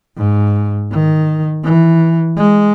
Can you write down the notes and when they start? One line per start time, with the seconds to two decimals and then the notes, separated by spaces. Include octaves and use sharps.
0.17 G#2
0.92 D#3
1.64 E3
2.37 G#3